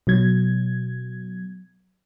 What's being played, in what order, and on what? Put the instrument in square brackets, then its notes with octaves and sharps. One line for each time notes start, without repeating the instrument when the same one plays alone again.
[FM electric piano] B2 F#3 G#6